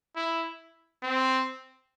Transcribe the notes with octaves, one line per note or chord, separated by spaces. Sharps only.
E4
C4